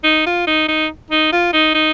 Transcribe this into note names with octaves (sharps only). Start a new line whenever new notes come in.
D#4
F4
D#4
D#4
D#4
F4
D#4
D#4